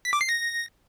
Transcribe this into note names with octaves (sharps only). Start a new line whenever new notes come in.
B6
D6
C7
A#6